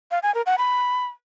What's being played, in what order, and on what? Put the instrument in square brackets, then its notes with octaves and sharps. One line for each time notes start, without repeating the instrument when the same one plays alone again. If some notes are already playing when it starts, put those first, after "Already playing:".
[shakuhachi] F5
G#5
A#4
F#5
B5